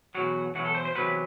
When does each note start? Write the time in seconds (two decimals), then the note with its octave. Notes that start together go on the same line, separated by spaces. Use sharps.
0.15 E2 B2 F#3 F#4
0.55 E2 B2 F#3 F#4
0.65 A4
0.75 C5
0.85 C5
0.95 E2 C3 F#3 B3 B4